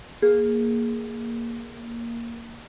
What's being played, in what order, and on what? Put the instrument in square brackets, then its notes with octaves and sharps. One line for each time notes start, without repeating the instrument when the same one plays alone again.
[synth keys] A#3 [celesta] G#4